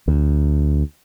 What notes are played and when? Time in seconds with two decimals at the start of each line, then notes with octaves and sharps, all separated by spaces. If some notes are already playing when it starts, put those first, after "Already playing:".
0.08 D2